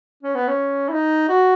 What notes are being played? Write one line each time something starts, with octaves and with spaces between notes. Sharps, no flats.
C#4
B3
C#4
E4
D#4
F#4